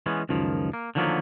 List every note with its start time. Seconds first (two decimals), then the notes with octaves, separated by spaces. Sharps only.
0.06 E3 G#3 B3 C#4
0.29 C#2 F#2 D#3 F3
0.73 A#3
0.95 D3 D#3 F3 F#3 A#3 B3